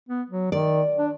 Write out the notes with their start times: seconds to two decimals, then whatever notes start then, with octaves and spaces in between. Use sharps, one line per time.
0.09 B3
0.30 F#3
0.52 D#3 D5
0.98 D4